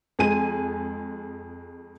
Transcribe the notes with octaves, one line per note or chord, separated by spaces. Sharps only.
F2 G#3 G#5 D#7